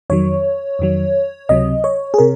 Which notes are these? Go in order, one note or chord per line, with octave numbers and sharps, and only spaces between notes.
F2 D#3 F#3 C#5
F2 D#3 F#3
C#2 C3 F#3 D#5
C#5
G#4
C3 A#4